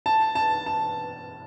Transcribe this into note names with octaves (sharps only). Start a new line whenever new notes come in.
A5
A5
A5